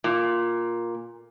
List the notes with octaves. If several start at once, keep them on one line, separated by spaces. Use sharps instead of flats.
A#2